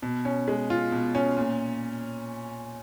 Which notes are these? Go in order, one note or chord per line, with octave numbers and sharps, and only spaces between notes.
B2
C#4
G#3
F4
B2
C#4
A#2